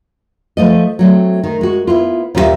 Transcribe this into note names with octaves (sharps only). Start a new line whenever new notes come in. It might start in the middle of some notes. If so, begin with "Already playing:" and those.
F3 A3 D#5
F#3 A3 C4
D#3
G#3 F#4
B3 E4 F4
D#2 A#2 F4 G4 E5